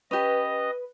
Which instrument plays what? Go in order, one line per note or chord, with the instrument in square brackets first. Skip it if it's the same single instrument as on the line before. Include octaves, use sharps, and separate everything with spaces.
[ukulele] C#4 G4 [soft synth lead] B4 [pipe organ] D#5